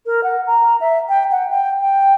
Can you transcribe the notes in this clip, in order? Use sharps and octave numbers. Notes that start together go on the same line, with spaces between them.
A#4
F#5
A#5
E5
G5
F#5
G5
G5